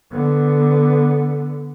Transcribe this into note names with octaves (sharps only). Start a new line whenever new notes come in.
D3 B3